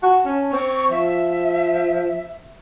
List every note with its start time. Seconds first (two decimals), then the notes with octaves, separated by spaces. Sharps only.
0.03 F#4 A5
0.25 C#4
0.53 C4 C#6
0.91 F3 E5